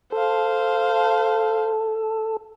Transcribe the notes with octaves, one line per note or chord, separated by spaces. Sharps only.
A4 C5 F5